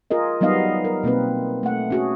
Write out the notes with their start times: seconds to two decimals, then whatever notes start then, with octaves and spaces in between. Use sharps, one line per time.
0.11 F4 G#4 A#4 D#5
0.41 F#3 G3 B3 D#4 D#5 F5
0.84 A#4
1.03 B2 A#3 C4 B4
1.63 A3 F#5
1.90 C#4 F#4 G#4